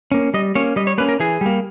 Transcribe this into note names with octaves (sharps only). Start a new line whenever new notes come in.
A#3 C#4
G3 D#5
A#3 C#4 C#5
G3 D#5
C#5
A#3 C#4 B4
A#4
E3 G#4
G3 A#3